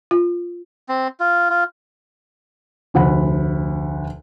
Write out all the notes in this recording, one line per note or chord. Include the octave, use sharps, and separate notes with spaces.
F4
C4
F4
F4
F1 D2 F#5 B5